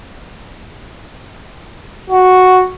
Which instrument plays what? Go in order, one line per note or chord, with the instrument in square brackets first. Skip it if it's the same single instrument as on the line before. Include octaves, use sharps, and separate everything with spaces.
[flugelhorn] F#4